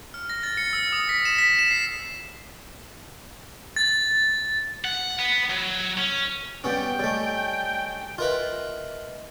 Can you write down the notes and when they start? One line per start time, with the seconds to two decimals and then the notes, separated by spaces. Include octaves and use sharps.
0.14 F6
0.30 A#6
0.43 A6
0.57 C#7
0.73 E6
0.92 D#6
1.09 B6
1.25 E7
1.38 B6
1.59 E7
1.71 C7
3.76 A6
4.85 F#5
5.19 B3
5.50 F#3
5.98 C#4
6.64 G3 B3 C#4 G5
6.99 G3 A3 C#5 D#5 G#5
8.18 F4 A#4 B4 D#5 E5